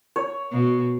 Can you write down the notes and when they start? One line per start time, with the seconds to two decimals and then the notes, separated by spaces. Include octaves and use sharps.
0.16 C#5
0.51 B2